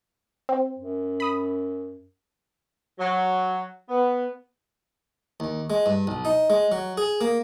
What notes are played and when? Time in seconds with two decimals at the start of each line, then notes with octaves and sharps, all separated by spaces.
0.49 C4
0.79 F#2
1.20 B5 D#6
2.98 F#3
3.89 B3
5.40 D#2
5.70 G#3
5.86 G2
6.07 B1
6.25 D#4
6.50 G#3
6.72 F#3
6.97 G#4
7.21 A#3